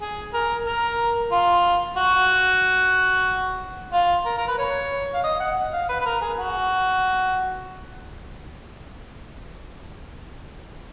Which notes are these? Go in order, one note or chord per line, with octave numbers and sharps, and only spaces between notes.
G#4
A#4
A#4
F4
F#4
F4
A#4
A#4
B4
C#5
F5
D#5
F#5
F5
B4
B4
A#4
G#4
F#4